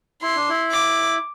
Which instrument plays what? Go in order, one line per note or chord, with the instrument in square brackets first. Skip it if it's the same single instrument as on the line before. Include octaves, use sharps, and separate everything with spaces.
[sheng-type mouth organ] E4 [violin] C6
[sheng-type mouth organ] D4
E4
[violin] D6